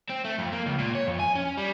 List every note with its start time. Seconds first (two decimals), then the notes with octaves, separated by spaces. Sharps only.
0.10 C4
0.25 A3
0.39 F2
0.53 A#3
0.66 C#2
0.79 A#2
0.95 C#5
1.07 F2
1.19 G#5
1.35 C#4
1.57 G3